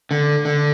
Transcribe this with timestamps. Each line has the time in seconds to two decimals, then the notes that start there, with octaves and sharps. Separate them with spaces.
0.11 D3
0.45 D3